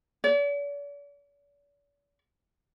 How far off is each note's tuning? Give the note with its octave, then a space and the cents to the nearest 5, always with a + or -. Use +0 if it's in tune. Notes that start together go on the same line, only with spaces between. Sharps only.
D5 -45